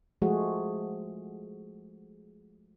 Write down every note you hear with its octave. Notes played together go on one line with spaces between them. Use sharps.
F3 G#3 A3 F#4 G#4